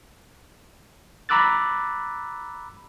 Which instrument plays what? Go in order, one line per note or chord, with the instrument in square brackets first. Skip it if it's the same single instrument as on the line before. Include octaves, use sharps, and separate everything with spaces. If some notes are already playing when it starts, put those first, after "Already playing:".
[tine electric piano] A#5 B5 D6 E6 F#6 A6